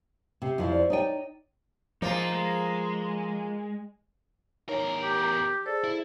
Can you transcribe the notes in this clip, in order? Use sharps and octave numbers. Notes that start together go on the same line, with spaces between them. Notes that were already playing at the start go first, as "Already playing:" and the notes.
C3
F2 F3 E4
C5 D5
D#4 C#5 D5 G5 D#7
F3 A#3 D#4 F4 G#4
G#3
E2 D#4 A#4 C#5
G4
G#4 A4 C5 D5
E4